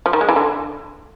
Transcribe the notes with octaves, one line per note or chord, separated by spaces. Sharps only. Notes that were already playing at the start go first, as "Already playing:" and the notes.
F3
D#3
G#3
E3
D3